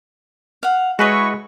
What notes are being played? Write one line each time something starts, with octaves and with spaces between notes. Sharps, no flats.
F5 F#5
G#3 E4 F#4 G#4 B4 C#5 D#5 C#6